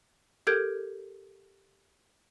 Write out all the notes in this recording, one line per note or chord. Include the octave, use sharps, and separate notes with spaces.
G4 A4 A#4 G6 G#6 D7